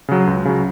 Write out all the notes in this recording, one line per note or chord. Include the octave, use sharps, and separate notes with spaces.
C#3 F#3
C#2
C#3 F#3